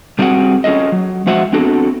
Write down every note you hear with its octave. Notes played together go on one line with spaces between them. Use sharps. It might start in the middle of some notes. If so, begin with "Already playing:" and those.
G3 C4 D4 F#4 G#4 F#5
C#4 F4 G#4 A4 D#5
F#3
F3 G#3 F#4 C5 E5 F#5
B3 C4 D4 F#4 A4